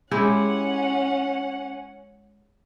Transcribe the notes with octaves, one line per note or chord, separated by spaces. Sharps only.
G#3 C#4 E4 G4 F#5